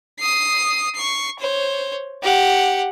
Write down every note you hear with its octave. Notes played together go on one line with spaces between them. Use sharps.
D#6 C7
C#6 C7
C5 C#5
G4 F#5